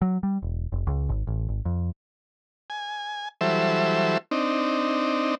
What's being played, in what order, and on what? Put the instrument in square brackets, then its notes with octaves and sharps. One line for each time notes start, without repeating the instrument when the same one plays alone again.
[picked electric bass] F#3
G3
E1
F1
C#2
G#1
A1
G#1
F2
[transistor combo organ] G#5
E3 F#3 G3 A4 C5 E5
C4 D4 D#4